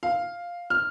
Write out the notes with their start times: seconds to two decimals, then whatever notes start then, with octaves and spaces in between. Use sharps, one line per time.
0.03 F5
0.70 F6